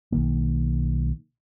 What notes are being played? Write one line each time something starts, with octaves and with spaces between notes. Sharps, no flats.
B1 D#3 A#3